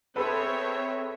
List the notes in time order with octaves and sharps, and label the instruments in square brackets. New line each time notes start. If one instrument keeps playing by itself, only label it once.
[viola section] C4 C#5 E5 [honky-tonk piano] G#4 A4 B4